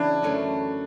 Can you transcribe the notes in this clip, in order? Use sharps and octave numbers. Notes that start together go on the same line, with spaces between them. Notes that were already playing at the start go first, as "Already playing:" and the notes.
Already playing: C#3 E3 B3 D4 E4
F#2 D3 A3 C#4